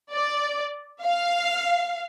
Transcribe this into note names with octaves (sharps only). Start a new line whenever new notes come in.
D5
F5